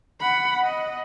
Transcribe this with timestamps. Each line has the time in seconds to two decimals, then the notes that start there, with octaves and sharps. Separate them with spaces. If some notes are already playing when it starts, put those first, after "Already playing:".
0.20 F#5 B5
0.63 D#5